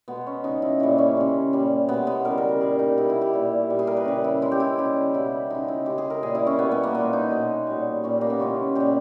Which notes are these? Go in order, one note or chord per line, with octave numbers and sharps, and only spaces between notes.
B2 G#3 B3
C#4
C#3 G#3 D#4
E4
A#2 G3 E4
C#4
C#3 G#3
A#2 G3
B2 G#3 B3
B3
C#3 E3 G3 A#4
A#4
A#4
A#2 G3 G#4
D#4
B2 G3 E4
E4
G4
A#2 G3
A#2 G3
G#4
A#4
B4
C#3 G3
E4
C#3 G#3 E4
G4
E4
C#3 G3 G4
B2 G3 E4
C#3 G#3 D#4
E4
C#3 G#3 G4
G#4
A#4
A#2 G3 G#4
E4
C#4
B2 G3 B3
B3
A#3
A#2 G#3 B3
D#4
B2 G#3
A#2 G3
A#2 G3 C#4
A#3
B3
C#3 E3 G#3 C#4
A#2 G3 G4